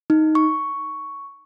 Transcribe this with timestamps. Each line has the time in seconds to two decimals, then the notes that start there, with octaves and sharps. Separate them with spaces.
0.10 D#4
0.35 C#6